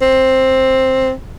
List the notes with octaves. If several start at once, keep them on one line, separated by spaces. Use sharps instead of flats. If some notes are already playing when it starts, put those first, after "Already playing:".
C4